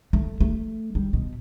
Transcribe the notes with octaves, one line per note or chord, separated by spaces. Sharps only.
A3
A3
G3
B2